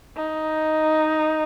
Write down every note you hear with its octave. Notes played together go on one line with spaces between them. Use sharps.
D#4